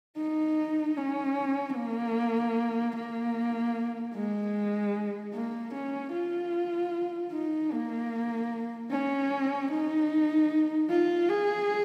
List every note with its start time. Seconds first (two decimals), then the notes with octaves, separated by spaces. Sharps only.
0.17 D#4
0.96 C#4
1.76 A#3
2.96 A#3
4.15 G#3
5.34 A#3
5.74 C#4
6.13 F4
7.32 D#4
7.72 A#3
8.91 C#4
9.71 D#4
10.90 F4
11.29 G#4